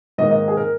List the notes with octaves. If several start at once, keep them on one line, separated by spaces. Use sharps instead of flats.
G#2 D#3 A#3 D#5
D#5
G#4
A#4